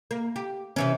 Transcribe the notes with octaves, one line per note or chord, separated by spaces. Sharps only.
A#3
G4
C3 E3 C#4